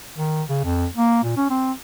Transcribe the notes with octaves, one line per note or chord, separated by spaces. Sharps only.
D#3
C#3
F2
A#3
A#2
C#4
C4